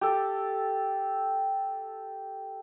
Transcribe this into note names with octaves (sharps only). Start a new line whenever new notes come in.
G4 A4